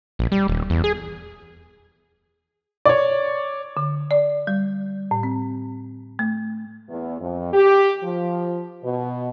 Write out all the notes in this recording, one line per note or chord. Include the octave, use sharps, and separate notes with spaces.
A#1
G3
D#1
E2
G#4
C#5 D5
D3
D5
G3
A2
C4
A3
E2
F2
G4
F3
B2